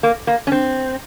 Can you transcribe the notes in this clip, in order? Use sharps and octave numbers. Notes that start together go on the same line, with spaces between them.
A#3
A#3
C#4
C4